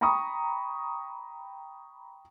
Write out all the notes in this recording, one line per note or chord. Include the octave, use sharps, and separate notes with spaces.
G5 A#5 B5 C#6 D#6